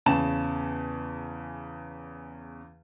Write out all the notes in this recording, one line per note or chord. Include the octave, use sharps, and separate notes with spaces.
E2 C#3 A5 E7